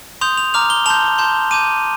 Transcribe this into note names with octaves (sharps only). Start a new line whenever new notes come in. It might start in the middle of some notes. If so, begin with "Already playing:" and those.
C6 D#6 G6 F7
F7
A#5 D6 F6 F7
G7
A5 C6 G6 F7
A5 C6 G6
A5 D6 G6 D#7